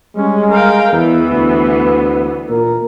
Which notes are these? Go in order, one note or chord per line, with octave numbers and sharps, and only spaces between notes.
G3 G#3 C#4
A#4 F5 G5
E2 E3 B3
D2 B4
A#2 A#4